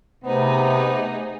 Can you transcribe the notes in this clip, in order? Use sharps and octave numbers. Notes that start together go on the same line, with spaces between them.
C3 A3 B3 D#4 G#4 C5